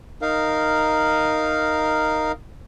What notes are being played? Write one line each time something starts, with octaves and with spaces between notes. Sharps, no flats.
D#4 A#4 F5